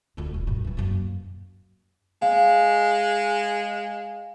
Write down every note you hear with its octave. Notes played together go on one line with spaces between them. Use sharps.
D2 F4
D#1
F#2 A#2
G2 E3
F#2 A#3
G#3 F5